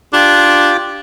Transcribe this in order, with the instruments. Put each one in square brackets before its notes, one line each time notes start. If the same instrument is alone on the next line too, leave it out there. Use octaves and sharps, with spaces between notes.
[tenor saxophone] D4 [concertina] F4 G4 D6